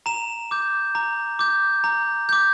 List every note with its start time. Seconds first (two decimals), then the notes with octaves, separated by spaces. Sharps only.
0.06 A#5 E7
0.51 D6 G6
0.95 A#5
1.39 D6 G6
1.84 A#5
2.29 D6 G6